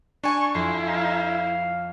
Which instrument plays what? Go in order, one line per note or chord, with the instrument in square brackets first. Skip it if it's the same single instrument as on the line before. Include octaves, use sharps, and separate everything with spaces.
[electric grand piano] D4 G#5 [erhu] C#6 [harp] D#7
[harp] F2 [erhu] E4 [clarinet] C6
[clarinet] F5